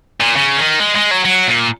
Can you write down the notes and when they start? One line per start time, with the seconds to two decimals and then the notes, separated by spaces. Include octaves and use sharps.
0.21 A#2
0.36 C#3
0.58 D#3
0.80 G#3
0.95 G#3
1.11 F#3
1.25 F#3
1.47 A#2